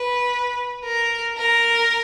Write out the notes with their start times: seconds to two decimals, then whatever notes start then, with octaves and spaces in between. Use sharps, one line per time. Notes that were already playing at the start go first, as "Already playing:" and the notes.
Already playing: B4
0.84 A#4
1.37 A#4